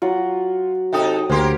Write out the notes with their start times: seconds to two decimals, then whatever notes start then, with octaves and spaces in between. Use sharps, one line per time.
0.02 F#3 F4 F#5
0.93 C3 D#4 A4 D#5 G5 D#6
1.29 D2 A#3 G4 A#4 C5 C6